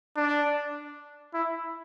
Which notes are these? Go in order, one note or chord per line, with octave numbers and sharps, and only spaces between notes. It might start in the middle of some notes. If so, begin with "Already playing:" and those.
D4
E4